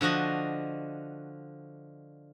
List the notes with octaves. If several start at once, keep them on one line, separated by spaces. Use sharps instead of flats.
D3 F3 F#4 D#5